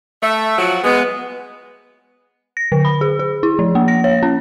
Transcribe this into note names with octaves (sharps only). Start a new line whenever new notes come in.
A3 E5
F3 F#3 F#4
G#3 B3
A#6
D3
B5
G#4
G#4
E4
F3
A#3
A#6
C#5
C#4